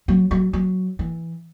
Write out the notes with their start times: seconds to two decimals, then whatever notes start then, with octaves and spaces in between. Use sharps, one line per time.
0.08 F#3
0.31 F#3
0.53 F#3
0.99 E3